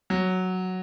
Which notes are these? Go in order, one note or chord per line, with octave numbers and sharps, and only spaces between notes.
F#3